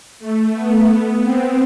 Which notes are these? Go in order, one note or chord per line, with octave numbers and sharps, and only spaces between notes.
A3
B3
B3
C4